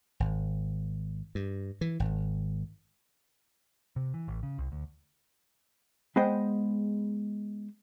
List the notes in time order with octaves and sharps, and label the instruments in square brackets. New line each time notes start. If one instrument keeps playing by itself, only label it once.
[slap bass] G#1
G2
E3
G#1
[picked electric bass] C3
E3
A1
C#3
C2
D2
[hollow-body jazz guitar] G#3 B3 G#4 C5 D#5 G5